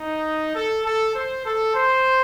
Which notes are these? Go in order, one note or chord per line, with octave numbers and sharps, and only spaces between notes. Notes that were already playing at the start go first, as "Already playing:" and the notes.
Already playing: D#4
A4
A4
C5
A4
C5